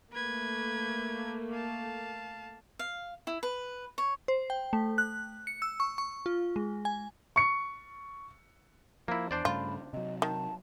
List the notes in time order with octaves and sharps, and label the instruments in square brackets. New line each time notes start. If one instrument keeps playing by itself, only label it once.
[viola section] A3 A#3 [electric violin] B4 G#6
[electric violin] F5 A5
[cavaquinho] F5
E4
B4
C#5
[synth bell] C5
G5
A3
F#6
C#7
E6
C#6
C#6
F4
G#3
G#5
[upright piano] C#6 C#7
[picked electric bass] F3 [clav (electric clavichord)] A#3 E4
[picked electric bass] E2 [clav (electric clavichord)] D4 C5 D5
[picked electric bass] G2 C#3 A3 [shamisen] F4 [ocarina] B5
[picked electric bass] C3 F#3 [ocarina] D#5
[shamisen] D#3 [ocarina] A5